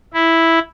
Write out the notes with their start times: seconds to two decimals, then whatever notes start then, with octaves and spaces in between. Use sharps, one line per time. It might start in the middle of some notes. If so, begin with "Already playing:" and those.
0.14 E4